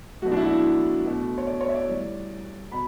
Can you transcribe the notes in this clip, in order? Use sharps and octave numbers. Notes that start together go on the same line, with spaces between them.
B2 F#3 A3 F#4
D4
E4
F#4
E4
B2 A3
C#5
D5
C#5
E5
D5
A2 G3
B2 B5